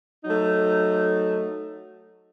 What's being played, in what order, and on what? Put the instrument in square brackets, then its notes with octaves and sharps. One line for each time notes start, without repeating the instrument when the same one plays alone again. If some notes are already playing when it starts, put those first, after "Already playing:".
[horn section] F#3 A3 D#4